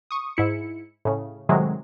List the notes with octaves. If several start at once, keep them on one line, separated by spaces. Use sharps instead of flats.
C#6 D#6
G#2 E4 C#7
A2 C#3
A2 C3 D#3 F#3 G#3